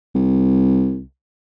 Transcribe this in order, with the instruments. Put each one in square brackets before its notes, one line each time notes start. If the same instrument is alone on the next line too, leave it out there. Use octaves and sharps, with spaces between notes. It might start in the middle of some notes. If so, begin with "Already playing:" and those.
[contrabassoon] C2